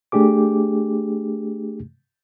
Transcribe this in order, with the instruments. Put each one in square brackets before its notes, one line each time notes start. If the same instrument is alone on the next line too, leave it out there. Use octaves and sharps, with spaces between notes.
[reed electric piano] A3 D4 G4 G#4 D6